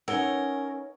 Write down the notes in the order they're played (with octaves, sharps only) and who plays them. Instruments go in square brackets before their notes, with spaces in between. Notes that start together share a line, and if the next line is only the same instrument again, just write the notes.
[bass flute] C#4 [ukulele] D#4 C#5 F#5 [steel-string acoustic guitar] A#4 [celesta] E6 G7